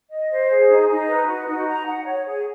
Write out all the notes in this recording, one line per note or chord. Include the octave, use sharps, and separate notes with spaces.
D#5
C5
G#4
D#4
D#4
B4
F#4
D#4
A#5
F#5
C#5
G#4